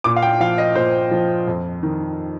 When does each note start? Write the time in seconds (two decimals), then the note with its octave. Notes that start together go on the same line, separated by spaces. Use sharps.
0.04 A#2 D6
0.16 F5
0.23 G5
0.40 F3 F5
0.58 D#5
0.75 A#2 C5
1.11 F3
1.47 F2
1.83 D#3